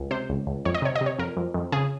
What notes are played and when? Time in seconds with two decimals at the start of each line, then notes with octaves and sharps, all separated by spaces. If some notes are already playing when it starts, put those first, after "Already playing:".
Already playing: C#2
0.10 C3 C5
0.29 C#2
0.47 C#2
0.65 F2 C#5
0.74 D#5
0.82 C3 C#5
0.96 D#5
1.01 C3
1.06 C#5
1.19 F2 A#4
1.37 F2
1.54 F2
1.72 C#3 G#4